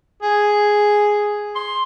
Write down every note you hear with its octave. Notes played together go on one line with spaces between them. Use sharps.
G#4
C6